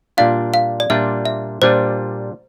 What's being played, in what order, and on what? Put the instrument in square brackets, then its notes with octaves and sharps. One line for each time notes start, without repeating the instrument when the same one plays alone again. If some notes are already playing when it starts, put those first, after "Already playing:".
[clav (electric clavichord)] A#2 G3 D4 F4 [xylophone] F5
[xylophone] F5
D5
[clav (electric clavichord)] A#2 G3 D4 F4 [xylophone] E5
[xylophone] E5
[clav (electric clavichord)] A#2 G3 D4 F4 [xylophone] C5